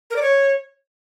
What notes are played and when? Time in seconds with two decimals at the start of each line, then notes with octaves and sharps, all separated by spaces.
0.11 A#4
0.16 D5
0.22 C#5